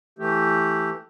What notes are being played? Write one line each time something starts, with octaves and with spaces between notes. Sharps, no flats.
E3 A3 G4